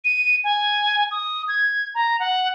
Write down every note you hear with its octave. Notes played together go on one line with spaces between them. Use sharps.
D#7
G#5
D#6
G#6
A#5
F#5